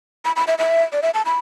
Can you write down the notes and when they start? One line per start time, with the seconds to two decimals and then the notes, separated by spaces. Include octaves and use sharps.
0.25 B5
0.36 B5
0.47 E5
0.59 E5
0.93 D5
1.03 E5
1.14 A5
1.26 B5